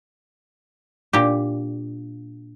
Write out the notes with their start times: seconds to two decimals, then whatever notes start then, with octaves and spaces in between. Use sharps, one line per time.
1.13 A#2 D4 G4